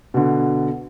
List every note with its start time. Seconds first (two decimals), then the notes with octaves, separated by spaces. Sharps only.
0.14 B2 D3